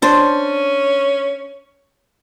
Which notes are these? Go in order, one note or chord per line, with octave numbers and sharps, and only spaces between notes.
C#4 D4 C5